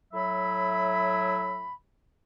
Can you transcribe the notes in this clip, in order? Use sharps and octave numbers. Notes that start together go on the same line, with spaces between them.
A2 F#3 E5 B5